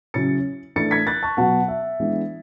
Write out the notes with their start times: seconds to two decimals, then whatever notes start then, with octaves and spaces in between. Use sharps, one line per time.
0.14 C#3 F#3 C#4 E4 A6 C#7
0.76 A2 E3 A3 D4 A6 C#7
0.91 G#6 B6
1.07 F#6 A6
1.23 A5 C#6
1.37 B2 F#3 B3 F#5 A5
1.68 E5
2.00 E3 G#3 B3 D4